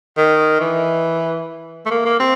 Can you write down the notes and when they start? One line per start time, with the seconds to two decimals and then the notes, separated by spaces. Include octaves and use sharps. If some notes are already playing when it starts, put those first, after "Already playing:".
0.17 D#3
0.61 E3
1.86 A3
1.91 A#3
2.06 A#3
2.20 C4